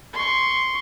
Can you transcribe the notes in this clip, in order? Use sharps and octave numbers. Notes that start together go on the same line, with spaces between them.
C6 C#6